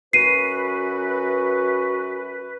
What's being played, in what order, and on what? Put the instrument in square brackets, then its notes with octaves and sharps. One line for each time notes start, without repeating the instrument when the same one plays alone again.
[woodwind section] F#2 F#4 B4 [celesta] C7 D#7